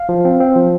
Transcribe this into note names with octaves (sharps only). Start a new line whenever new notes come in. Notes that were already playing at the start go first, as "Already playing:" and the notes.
Already playing: F5
F3
C4
C4
F3